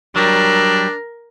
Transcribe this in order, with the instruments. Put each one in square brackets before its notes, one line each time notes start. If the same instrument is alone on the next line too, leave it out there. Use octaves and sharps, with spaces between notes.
[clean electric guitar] F#3 G3 [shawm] D4 [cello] A#4